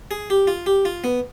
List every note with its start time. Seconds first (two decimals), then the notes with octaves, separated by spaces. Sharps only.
0.11 G#4
0.30 G4
0.47 F4
0.66 G4
0.85 F4
1.04 B3